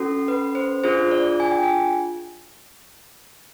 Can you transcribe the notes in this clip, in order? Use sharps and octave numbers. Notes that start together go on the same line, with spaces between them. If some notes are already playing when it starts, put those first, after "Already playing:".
Already playing: C#4 F#4 A4
B4
C5
D4 F4 G#4 C5
D5
G#5
G5
G#5